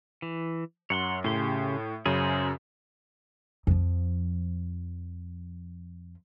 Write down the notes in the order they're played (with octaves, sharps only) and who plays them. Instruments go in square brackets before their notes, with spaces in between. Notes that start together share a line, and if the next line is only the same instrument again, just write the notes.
[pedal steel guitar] E3
[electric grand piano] F#2 [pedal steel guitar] C#5 F#5 C6
[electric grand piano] A2 [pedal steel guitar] C#3 G4 C6
[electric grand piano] F#2 C#3 [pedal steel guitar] G#4 C5
[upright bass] F2 F3